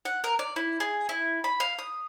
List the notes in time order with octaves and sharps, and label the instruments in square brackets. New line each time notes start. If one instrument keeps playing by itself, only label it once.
[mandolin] F#5
A#4
D5
E4
G#4
E4
B5
F5
D#6